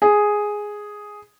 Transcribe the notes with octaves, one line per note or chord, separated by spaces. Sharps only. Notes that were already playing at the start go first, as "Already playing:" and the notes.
G#4